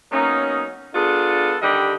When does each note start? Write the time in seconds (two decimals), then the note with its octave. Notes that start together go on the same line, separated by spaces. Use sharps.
0.12 F#3 A#3 B3 C#4 D#4
0.94 B3 D4 F4 G#4 A4
1.62 D3 D#3 G3 G4 D#5 B5